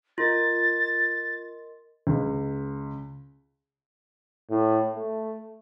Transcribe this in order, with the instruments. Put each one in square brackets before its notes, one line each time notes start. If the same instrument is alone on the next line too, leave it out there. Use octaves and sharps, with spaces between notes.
[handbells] F4 [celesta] A#4 D#5 C6 [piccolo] A6
[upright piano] C#2
[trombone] A2
A3